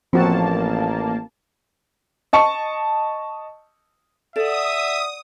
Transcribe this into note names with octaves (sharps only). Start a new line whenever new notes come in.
A1 F3 A#3 C4 F#4 A5
D#5 A5 C#6 C#7
A4 D5 E5 F#5 D#6